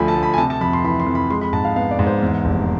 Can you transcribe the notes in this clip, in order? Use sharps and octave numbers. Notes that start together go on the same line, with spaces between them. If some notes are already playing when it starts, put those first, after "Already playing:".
Already playing: D2 D3 F3 G#5 B5
A5
D2
B5
G#5
C3 A5
A5
F2 B5
C6
E3 B5
C6
F2
B5
G#3 C6
B5
G#2 A5
F5
B3 F5
D5
G#2
C5
E2
F1